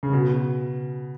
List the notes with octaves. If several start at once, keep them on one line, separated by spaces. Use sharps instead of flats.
C#3
B2